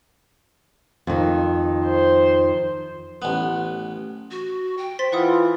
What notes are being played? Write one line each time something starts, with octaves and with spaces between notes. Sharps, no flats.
F2 D#3
C5
A1 B3
F#4
G5
C5 C6 A6 B6
E3 F4 B4 F#5 D#6